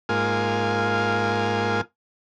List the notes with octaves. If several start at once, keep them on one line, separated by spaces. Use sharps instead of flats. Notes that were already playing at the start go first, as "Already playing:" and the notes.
G#2 A#3 F4 G#5